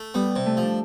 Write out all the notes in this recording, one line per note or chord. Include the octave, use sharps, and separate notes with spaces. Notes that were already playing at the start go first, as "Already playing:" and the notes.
Already playing: A3
G3 B3
C3
A3
F3
D4